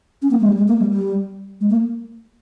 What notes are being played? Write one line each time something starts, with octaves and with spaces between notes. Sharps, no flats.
C#4
A#3
G#3
G3
G#3
A#3
G3
G3
G#3
A#3